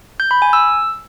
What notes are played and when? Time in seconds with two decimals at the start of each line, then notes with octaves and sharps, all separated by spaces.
0.20 G6
0.31 B5
0.42 G#5
0.53 E6